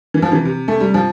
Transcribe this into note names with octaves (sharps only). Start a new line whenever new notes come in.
E3
F3
C3 E3
C3
A3
G3
F3